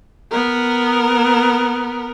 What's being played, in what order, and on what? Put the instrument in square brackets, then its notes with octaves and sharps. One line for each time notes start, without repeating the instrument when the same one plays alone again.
[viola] B3 A#4